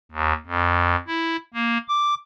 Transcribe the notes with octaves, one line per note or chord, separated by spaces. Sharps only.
D#2
F2
E4
A#3
D6